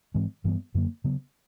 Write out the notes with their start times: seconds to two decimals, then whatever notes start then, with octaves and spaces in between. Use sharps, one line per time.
0.14 G#2 E3 G#3 C4
0.44 G2 E3 G3 B3
0.75 F#2 D3 F#3 A#3
1.04 C#3 F#3 B3